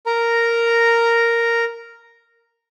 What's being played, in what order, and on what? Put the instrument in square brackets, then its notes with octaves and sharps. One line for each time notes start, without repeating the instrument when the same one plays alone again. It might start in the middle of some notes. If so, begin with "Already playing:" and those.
[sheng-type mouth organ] A#4 A#5